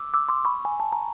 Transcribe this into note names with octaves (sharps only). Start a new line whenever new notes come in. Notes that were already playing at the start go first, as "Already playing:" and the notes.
Already playing: D6 E6
D6 E6
C6 D6
B5 C#6
G#5
A5
A#5